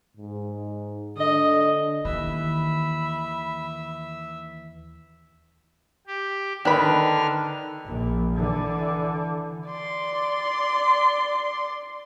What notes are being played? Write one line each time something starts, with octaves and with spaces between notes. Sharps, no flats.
G#2
D3 D#5
D#2 D#3 E3 B4 E5 B5
G4
D3 D#3 D4 B4 B5 F6
A#1 A#2
D3 E3
D5 C6